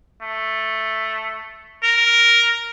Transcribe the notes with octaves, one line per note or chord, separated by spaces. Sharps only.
A3
A#4